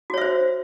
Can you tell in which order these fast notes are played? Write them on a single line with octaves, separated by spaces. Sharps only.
F#4 C#5 E5 C5